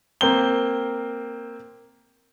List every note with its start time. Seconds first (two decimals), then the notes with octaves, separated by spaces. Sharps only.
0.21 A#3 C4 G7